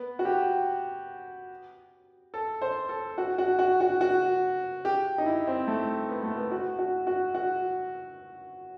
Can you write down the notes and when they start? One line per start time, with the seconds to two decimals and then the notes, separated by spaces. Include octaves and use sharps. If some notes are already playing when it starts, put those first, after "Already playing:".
Already playing: B3
0.19 F#4
0.25 G4
2.34 A4
2.62 C5
2.89 A4
3.18 F#4
3.38 F#4
3.59 F#4
3.81 F#4
4.01 F#4
4.85 G4
5.18 D#4
5.26 E4
5.47 C4
5.67 A3
6.09 B3
6.23 A3
6.37 B3
6.51 F#4
6.79 F#4
7.07 F#4
7.35 F#4